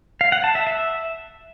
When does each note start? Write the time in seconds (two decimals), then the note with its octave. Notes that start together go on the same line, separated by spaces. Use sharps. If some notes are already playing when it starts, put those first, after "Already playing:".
0.21 F5
0.32 F#5
0.44 A5
0.55 E5
0.67 E5